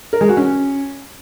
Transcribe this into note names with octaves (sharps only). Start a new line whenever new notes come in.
A#4
G#3
F#4
C#4